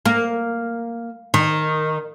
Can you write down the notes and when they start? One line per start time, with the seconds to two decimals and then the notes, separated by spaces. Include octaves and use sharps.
0.05 A#3
1.34 D#3